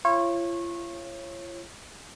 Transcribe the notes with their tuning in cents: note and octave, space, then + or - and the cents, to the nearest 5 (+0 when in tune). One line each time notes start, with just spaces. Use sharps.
F4 -40 C#5 -25